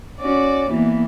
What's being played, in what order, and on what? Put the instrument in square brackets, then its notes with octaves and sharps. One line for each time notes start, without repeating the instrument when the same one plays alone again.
[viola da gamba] C#4 F#4 D5
E3 A#3 B3